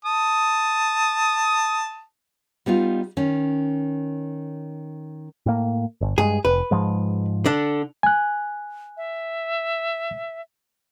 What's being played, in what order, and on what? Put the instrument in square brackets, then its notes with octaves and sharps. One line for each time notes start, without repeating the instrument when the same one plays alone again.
[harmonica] A5 D#6
[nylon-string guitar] G3 B3 D#4 F4
D#3 C#4
[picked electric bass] A2 A#3
G1
[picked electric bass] G2 G#3 [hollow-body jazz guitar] G#4
[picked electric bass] F1 [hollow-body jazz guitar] B4
[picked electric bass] G#2 F3 G#3
[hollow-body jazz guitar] D3 D4
[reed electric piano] G#5 F#6
[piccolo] E5